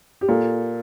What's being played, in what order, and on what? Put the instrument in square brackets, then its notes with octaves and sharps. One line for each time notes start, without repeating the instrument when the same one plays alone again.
[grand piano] G4
[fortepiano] A#2 [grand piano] A4